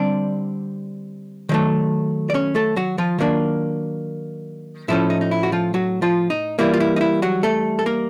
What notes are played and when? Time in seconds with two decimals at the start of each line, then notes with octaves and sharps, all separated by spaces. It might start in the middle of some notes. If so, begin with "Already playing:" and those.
Already playing: D3 G3 C4 D4 D5
1.49 D#3 F#3 A3
2.30 D5
2.34 C#4 C#5
2.55 A3 A4
2.76 F#3 F#4
2.98 F3 F4
3.19 D#3 F#3 A#3 D4
4.88 A2 F3 A3 C#4 E4
5.10 D#4
5.21 D#4
5.31 E4
5.43 F#4
5.52 F3 F4
5.74 F#3 F#4
6.02 F3 F4
6.30 D#4
6.59 E3 G3 A#3 E4
6.74 F4
6.80 E4
6.96 D#4
7.01 E4
7.22 F#3 F#4
7.43 A3 A4
7.79 A4
7.86 A#3 A#4